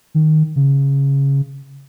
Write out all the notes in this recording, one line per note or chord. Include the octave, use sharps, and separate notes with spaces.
D#3
C#3